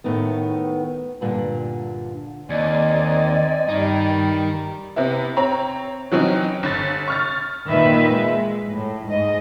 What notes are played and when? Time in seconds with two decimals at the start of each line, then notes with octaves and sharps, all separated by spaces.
0.04 A2 D#3 A3 B3
1.21 G2 A#2 D3
2.50 D#2 C4 D5 D#5 G#5
3.69 G2 D#3 G3 D#4
4.96 C3 B3 E4
5.37 C4 C#5 A#5
6.12 E3 F#3 C4 C#4 D#4
6.63 G1 A6
7.08 C#6 F6 A6
7.69 A#2 D#3 B4 E5
8.13 G#3
8.70 A2
9.08 G#2 D#5